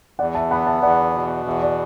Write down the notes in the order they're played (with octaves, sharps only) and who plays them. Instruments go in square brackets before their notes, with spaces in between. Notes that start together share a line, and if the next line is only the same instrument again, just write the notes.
[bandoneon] E2 [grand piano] D5 F#5
[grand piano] E5 A5
[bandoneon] B3 [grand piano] F#5 B5
[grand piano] E5 A5
[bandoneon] E2 [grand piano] D5 F#5
[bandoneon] B2
[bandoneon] E2 [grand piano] E5
[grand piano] D5